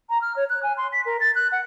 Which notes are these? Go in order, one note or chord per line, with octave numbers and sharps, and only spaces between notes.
A#5
F6
C#5
F#6
G#5
C6
B6
A#4
A6
F#6
F#5